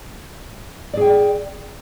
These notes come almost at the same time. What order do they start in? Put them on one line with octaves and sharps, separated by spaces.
D5 G#4 G5